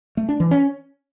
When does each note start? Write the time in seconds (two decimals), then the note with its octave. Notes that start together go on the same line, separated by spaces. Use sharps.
0.17 A3
0.29 D4
0.40 E3
0.51 C#4